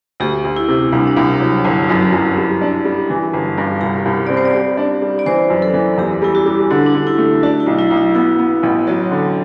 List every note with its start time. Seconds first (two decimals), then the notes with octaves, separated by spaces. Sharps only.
0.20 D2 G4
0.45 D2
0.56 E4
0.68 C3
0.92 C2 D4
1.07 D4
1.17 C2
1.40 F#3
1.64 G1 E4
1.89 F#2
2.00 F#4
2.12 F#2
2.38 G3
2.61 D4
2.85 G3
3.10 E3
3.33 G1
3.58 G2
3.81 C2 G4
4.05 C2
4.27 C4 D5
4.37 C5
4.45 D5
4.54 G3
4.77 D4
5.02 G3
5.19 D5
5.26 E3 C5
5.50 F#2
5.62 A4
5.74 E3
5.98 E2 G4
6.22 G3 E4
6.35 F#4
6.46 G3
6.70 D3 D4
6.86 D4
6.94 D3
7.07 E4
7.18 A3
7.43 D4 F#4
7.60 E4
7.66 B1
7.79 E4
7.90 B1
7.97 E4
8.15 B3 E4
8.39 B3
8.63 A1
8.87 F#3 F#4
9.11 D3